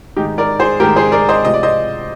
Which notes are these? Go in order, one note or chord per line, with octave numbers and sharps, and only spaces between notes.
G#2 D#3 G#3 D#4 G4
A#4 D5
G#4 C5
G#2 D#3 G#3 G4 A#4
G#4 C5
A#4 D5
C5 D#5
C3 F3 G#3 D#5
D5
C5 D#5